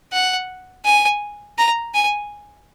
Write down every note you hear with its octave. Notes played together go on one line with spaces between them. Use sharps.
F#5
G#5
A#5
G#5